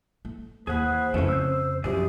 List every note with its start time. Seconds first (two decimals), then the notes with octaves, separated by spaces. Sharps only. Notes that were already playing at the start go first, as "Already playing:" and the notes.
0.25 A3
0.67 D#2 E3 G#4 C5 F#5 B5
1.14 F2 C#3 E3 A3 C#4
1.29 E6 G6
1.84 F#2 D#3 F3 G4 G#4 D5